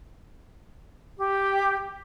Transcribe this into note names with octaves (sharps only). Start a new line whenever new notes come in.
G4